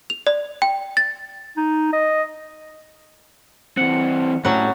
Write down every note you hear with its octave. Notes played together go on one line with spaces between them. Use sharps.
F7
D5
G5
A6
D#4
D#5
E3 C4 F#5
A2 F#3 G3 C#4 F#5